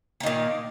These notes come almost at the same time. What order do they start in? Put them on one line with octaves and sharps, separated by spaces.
A#3 D#3 A#2